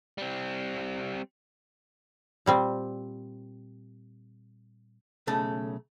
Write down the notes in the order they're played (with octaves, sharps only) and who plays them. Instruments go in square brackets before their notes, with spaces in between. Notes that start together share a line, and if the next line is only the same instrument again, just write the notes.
[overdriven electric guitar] G3 C4
[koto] A#2 G3 C4
[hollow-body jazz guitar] B1 C#3 A3 A5